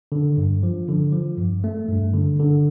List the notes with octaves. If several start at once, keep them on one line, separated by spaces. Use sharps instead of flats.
D3
G2
F3
D3
F3
G2
A3
G2
D3
D3